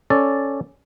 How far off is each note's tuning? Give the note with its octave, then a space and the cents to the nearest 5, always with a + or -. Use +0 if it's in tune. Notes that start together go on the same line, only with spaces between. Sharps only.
C#4 +0 A4 +0 D5 +0